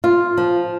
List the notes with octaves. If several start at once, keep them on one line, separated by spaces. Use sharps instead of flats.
F4
F3